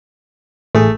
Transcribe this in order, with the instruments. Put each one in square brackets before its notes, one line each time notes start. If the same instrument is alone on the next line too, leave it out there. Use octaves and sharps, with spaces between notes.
[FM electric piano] A1 G#4 [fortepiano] A3